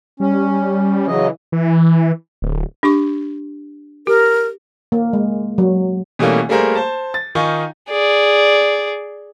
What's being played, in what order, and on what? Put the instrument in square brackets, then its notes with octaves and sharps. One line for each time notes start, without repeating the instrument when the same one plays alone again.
[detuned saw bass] G3 [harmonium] C#4
[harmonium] C#3 F#3 D#5 [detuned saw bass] E3
[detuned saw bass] E3
D1
[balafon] D4 G4 C#6
[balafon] G4 [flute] A#4
[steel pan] A#3
G#3
F#3
[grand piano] B2 E3 G3 A3 A#3 C#4
G3 A3 A#3 G#4 A#4 C5
C5 A5
A6
D#3 D#4 F4 G#5 C#6
[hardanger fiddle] G#4 D5